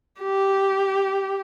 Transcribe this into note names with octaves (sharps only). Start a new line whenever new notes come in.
G4